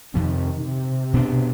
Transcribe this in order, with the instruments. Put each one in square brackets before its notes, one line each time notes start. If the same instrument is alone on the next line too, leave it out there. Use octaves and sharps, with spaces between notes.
[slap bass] F2 C3 F3 C4 [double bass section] D#3
[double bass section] C3
[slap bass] B2 B3 D4